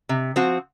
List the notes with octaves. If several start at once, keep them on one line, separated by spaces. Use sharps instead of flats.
C3
F3 C4 F#4